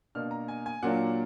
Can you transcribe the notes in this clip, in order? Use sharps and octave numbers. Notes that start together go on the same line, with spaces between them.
B2 A#3 D4 F6
A#5
G#5
G#5
A#2 F#3 A#3 D4 F#5